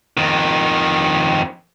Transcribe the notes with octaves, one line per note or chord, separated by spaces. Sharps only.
F2 D#3